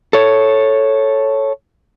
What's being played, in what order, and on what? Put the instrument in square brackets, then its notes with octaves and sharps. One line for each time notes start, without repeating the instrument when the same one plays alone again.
[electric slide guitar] A4 C#5